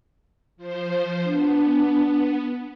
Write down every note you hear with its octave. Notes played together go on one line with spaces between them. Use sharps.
F3 C5
B3 D4